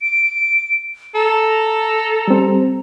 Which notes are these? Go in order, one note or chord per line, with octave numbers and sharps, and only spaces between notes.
D7
A4 A#5
G3 C4